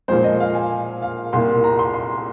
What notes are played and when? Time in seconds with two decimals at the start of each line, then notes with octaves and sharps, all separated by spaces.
0.08 A#2 F3 G#3 C5
0.24 D#5
0.40 F5
0.55 G#5
1.02 F5
1.33 C2 A#2 A#3 C6
1.64 A#5
1.79 C6
1.94 C6